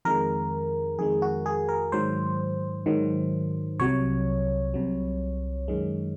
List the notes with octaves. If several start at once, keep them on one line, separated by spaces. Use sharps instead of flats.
F2 D#3 G#3 A#4
F2 D#3 G#3 G#4
F#4
G#4
A#4
G#2 D#3 F#3 C5
G#2 D#3 F#3
C2 C3 F#3 C#5
C2 C3 F#3
F#2 D#3 G#3